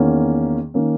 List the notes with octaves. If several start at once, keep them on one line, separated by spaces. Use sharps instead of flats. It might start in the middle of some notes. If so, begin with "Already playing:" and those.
Already playing: E2 D#3 A#3 C#4
D#3 A#3 C#4